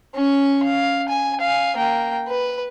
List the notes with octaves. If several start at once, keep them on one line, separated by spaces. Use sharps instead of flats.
C#4 C#6
F5
G#5
F5 G#5
A#3 G5
B4